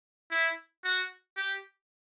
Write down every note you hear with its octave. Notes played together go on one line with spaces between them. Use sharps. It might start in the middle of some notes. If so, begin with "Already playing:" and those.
E4
F#4
G4